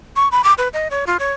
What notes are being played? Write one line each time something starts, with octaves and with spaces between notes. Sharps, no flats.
C#6
B5
D6
B4
D#5
C#5
F4
C#5